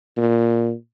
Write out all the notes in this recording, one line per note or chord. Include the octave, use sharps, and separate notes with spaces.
A#2